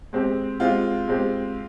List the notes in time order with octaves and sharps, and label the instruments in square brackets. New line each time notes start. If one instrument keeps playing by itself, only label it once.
[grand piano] G#3 C4 G4
[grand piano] G#3 C4 G4 [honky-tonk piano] F4
[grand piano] G#3 C4 G4